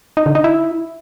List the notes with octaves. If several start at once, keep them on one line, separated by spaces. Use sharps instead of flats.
D#4
D3
D#4
E4